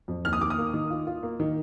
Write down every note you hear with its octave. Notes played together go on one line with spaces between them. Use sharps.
F2
D#2 F6
D#6
D#2 D6
D#6
A#3
D#3
F4
F4
A#3
D#3